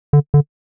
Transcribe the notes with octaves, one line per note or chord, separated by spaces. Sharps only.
D3
D3